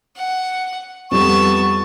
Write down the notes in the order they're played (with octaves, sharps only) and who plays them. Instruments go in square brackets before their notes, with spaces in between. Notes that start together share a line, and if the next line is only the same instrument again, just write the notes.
[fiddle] F#5
[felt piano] F2 G3 [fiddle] B3 A5 [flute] C#6